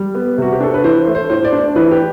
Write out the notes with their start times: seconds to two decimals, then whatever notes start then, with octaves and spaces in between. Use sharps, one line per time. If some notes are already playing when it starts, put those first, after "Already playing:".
Already playing: G3
0.15 B3
0.38 C3 F#4
0.52 G4
0.60 D4 A4
0.74 B4
0.84 E3 C5
1.07 A3
1.15 C5
1.30 A2 C5
1.45 D5
1.53 D4
1.76 E3 B4
1.91 G4